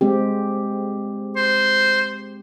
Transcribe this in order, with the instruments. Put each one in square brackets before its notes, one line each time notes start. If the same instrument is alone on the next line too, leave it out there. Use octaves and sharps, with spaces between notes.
[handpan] G#3 C4 G4
[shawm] C5